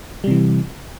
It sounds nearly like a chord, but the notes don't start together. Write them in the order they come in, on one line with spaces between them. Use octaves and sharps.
G3 C3 E3